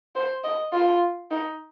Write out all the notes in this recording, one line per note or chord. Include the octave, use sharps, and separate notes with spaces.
C5
D#5
F4
D#4